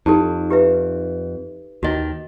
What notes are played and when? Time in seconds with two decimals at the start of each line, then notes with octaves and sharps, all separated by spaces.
0.06 F2 D#4 G4 A4
0.50 G4 B4 E5
1.83 D#2 D#3 F#4 D#5